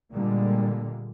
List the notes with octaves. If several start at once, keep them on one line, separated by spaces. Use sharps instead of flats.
A#2 D3 G3 G#3 A#3